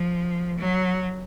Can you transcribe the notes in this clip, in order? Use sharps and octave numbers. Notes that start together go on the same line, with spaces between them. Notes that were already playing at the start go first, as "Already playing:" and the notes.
Already playing: F3
F#3